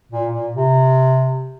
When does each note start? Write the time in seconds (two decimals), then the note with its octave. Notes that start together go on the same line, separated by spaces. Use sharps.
0.12 A#2
0.33 A#2
0.54 C3